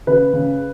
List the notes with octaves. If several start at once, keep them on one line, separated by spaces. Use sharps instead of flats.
C#3 B4
C#3